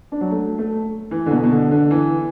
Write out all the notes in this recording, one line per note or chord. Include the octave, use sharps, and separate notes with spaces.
D4
F#3
A3
A3
E3
D3
B2
B2
D3
D3
E3